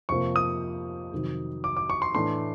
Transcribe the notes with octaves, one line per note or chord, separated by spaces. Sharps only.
F2 C3 F3 A#3 C#6
D#6
F2 C3 D#3 F#3
D6
D6
C#6
C6
A2 E3 A3 D4 C6